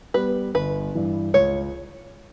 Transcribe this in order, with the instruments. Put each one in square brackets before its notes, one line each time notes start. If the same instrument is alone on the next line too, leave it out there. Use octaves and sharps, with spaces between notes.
[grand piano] G3 B3 [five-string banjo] B4
[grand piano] G1 [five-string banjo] B4
[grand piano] G2 E3
[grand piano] C#2 [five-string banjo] C#5